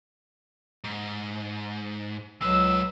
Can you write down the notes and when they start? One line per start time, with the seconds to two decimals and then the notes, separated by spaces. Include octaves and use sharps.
0.84 G#2
2.42 C#2 F#3 G#3 B4 E6